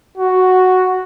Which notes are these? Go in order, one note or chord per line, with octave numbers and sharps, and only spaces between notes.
F#4